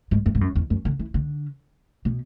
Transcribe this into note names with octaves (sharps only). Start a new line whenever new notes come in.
G#2
F#2
G#2
F#2
E2
F#2
D3
E3
D3
B2